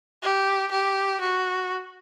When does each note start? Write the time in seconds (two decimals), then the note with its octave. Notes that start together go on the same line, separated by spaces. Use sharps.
0.23 G4
0.71 G4
1.21 F#4